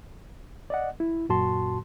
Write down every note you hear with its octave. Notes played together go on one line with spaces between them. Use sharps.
D5 D#5 F#5
E4
F#2 A#2 F#4 A5 C6